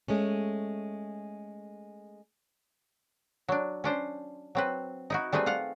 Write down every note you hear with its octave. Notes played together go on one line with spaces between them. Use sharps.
G#3 A3 C#4
F#3 D4
C#4 D4 C5
F#3 C4 B4
D#4 E4 F#4
G3 A3 C4 G#4 B4
F4 F5 F#5